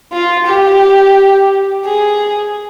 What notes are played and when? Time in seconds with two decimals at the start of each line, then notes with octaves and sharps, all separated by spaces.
0.13 F4
0.47 G4
1.85 G#4